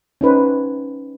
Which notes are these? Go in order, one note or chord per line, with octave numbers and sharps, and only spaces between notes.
C#4 D#4 B4 C5